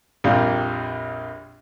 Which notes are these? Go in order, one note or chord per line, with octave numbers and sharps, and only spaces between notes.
A#1 F2 G3 A#3 F4